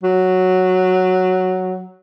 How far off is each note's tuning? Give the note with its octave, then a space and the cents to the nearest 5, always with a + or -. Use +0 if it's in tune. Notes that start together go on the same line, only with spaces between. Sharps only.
F#3 +0